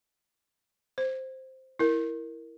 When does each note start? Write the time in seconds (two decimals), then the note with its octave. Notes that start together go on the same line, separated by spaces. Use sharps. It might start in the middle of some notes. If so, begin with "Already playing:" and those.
0.98 C5
1.79 E4 A#4